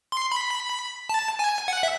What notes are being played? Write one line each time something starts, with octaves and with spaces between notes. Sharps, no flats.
C6
B5
A5
G#5
F#5
E5